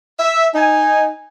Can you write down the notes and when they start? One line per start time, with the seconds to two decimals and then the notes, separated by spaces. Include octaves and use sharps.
0.19 E5
0.55 D#4 G#5